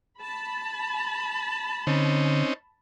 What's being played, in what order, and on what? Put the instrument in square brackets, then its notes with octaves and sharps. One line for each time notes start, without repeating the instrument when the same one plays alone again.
[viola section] A5 B5
[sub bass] D3 [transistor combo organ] C4 C#4 D#4